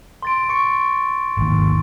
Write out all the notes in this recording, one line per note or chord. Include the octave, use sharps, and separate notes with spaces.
C6 A6 D7
C#6 C#7
G#1 D#2